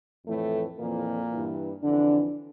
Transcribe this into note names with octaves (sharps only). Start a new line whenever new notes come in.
F2 A2 E3 A3
F2 A#2 E3 A#3
G2 E3
F2 D3 E3 D4